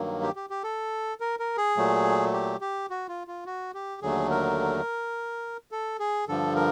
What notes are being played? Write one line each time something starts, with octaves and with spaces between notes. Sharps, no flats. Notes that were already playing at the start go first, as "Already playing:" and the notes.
Already playing: G2 D#3 F#3 A#3
G4
G4
G4
A4
A#4
A#4
G#4
A#2 F#3 A3
G4
G4
F#4
F4
F4
F#4
G4
D#2 D3 F#3 A3 G#4
A#4
A4
G#4
G2 D3 F3 A4
A#4